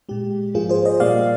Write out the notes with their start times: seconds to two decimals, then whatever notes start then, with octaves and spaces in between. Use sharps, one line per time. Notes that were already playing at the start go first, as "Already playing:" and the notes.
0.09 A#2 G#3 G4
0.54 G#2 F3 A#3 F4 G#4
0.69 G#4 C5
0.85 C5 D#5
1.00 A#2 G3 A#3 D5 F5